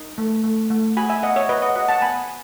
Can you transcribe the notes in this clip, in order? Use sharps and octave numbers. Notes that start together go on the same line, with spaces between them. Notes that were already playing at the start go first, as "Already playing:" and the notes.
Already playing: D#4
A3
A3
A3
F#4 G#5 B5
E5 G#5
B3 D#5 F#5
C#5 E5
F#4 B4 D#5
D#5 F#5
F#4 D#5 F#5
F#5 A5
B3 G#5 B5